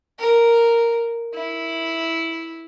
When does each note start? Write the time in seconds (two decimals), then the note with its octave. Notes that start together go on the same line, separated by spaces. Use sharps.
0.19 A#4
1.34 E4